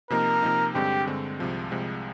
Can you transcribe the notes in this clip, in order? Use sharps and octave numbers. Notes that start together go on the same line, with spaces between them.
C3 F3 A#3 D#4 A#4
C3 F3 A#3 D#4
G2 D3 G#3 C4 G4
G2 D3 G#3 C4
C2 C3 F3 G#3
C2 C3 F3 G#3